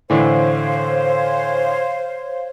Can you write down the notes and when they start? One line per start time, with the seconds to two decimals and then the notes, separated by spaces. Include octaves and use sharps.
0.10 A2 D3 E3 C5 C#5 F5